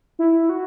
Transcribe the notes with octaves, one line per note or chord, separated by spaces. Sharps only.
E4
F#4